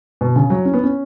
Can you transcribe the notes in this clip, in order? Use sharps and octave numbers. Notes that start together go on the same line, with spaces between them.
B2
C#3
F#3
C#4
B3
C#4